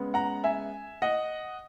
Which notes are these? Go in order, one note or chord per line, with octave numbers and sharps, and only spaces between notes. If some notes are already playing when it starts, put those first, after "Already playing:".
Already playing: C#3 G#3 B3
F#5 A#5
E5 G#5
D#5 F#5